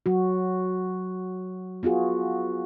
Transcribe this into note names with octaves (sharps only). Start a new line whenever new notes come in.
F#3 F#4
B3 F4 F#4 G#4